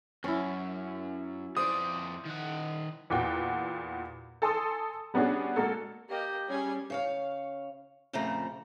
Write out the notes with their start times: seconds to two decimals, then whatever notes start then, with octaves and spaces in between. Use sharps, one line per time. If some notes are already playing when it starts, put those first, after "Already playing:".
0.24 F#2 C#4 E4
1.57 F2 C5 D5 D#6
2.26 D#3 F#5
3.10 E2 A#2 F#4 G5
4.42 A4 G#5 A5 C6 D#6 E6
5.14 G3 B3 C#4 D4 F#4 G#4
5.56 G#3 A#3 F#4 A4
6.09 A#3 G4 D#5
6.48 G3 C#4 G#4 G#5
6.90 C#3 C#5 F5
8.13 F2 A#2 C#3 A3 C4 A#5